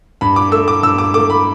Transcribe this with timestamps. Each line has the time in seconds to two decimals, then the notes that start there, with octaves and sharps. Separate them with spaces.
0.21 G2 B5
0.36 D6
0.52 A3 E6
0.68 D6
0.83 G2 E6
0.98 D6
1.14 A3 D6
1.30 B5